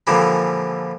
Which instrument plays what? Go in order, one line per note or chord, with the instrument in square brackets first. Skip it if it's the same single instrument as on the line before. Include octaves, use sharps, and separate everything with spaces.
[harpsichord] A#2 D3 E3 F3 G3 G#3